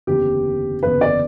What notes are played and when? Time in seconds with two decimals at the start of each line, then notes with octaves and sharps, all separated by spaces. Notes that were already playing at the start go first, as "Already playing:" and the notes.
0.07 F#1 E2 D3 G4
0.83 F#1 E2 D3 B4
1.01 D5